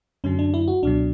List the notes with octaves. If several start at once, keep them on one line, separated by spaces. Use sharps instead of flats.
F#2 D3 F#3 C#4
D4
E4
F#4
C#2 B2 F#3 D4